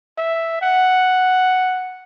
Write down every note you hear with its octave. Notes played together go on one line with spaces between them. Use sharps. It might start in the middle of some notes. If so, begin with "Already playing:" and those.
E5
F#5